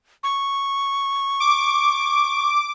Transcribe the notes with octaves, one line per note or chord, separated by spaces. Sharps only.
C#6
D6